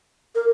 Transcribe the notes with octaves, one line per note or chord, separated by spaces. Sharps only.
A#4